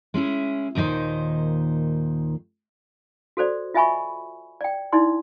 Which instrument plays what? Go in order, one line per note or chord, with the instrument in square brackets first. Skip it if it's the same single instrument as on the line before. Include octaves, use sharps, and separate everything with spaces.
[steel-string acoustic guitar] G#3 C#4 E4 G#4
D#2 A#2 D#3 D#4 C5
[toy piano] F#4 A4 C5 D5
F4 D#5 E5 G#5 B5 C#6
D5 G5
D#4 E4 D5 C6